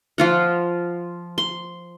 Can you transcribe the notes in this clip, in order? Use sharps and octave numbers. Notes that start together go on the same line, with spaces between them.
F3 F4 F#5
C6